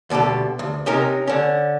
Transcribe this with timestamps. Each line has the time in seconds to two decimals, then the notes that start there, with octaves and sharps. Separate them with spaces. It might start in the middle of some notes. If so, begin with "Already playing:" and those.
0.10 D2 B2 G3 G4 A4
0.59 D2
0.86 C3 C#4 D#4 A#4
1.27 D3 C#4